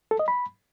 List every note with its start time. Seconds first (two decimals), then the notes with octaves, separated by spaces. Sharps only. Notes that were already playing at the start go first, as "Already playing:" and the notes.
0.11 A4
0.19 D#5
0.28 B5